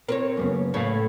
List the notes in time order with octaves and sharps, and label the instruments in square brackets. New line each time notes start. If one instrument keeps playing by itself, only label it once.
[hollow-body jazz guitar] C4 [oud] A#4 B4 C#5
[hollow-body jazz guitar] F#2 A#2 C#3 [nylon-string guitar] A#3 B3
[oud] A2 [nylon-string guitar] A3 [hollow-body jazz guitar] C#5 F5